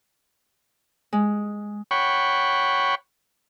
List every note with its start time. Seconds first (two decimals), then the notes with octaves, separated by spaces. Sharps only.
1.13 G#3
1.91 C#5 F#5 G5 B5 C#6